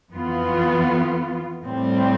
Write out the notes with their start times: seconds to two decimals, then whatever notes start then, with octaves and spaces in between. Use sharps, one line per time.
0.13 F2 E3 B3 F4
1.64 A2 G3 C4